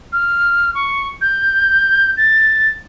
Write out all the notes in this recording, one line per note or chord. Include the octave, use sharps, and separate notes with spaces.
F6
C#6
G6
A6